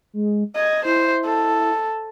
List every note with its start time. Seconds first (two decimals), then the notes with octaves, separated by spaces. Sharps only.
0.13 G#3
0.55 D#5 G#6
0.85 E4 C5
1.25 A4